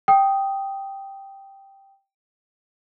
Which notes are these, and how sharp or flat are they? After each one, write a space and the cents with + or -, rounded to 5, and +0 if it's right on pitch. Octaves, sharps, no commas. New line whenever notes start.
G5 +0 D#6 +0